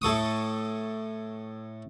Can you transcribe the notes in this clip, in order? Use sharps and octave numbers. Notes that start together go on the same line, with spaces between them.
A2 A4 C#6 D#6